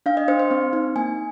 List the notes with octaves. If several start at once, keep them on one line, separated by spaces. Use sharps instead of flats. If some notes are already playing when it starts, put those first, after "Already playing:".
D4 F5
D#5
D4 C5
C5
C4
D#4
A#3 G#5